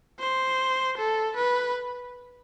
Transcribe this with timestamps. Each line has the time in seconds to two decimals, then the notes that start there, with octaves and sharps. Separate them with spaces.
0.20 C5
0.98 A4
1.37 B4